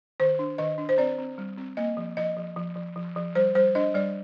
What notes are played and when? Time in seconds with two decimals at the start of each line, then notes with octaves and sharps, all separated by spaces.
0.20 D#3 C5
0.39 D4
0.58 D#3 D#5
0.78 D4
0.89 C5
0.98 C4 D5
1.18 C4
1.38 G3
1.58 C4
1.77 A#3 D#5
1.97 F3
2.17 F3 D#5
2.37 F3
2.56 F3
2.76 F3
2.96 F3
3.16 F3
3.35 G3 C5
3.55 G3 C5
3.75 D4 D#5
3.94 G3 D5